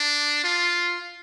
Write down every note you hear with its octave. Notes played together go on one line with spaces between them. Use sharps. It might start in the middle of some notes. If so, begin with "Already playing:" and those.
Already playing: D4
F4